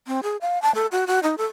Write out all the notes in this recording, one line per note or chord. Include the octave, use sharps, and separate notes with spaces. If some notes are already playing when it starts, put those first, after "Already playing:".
C4
G#4
F5
A5
A4
F#4
F#4
D#4
A4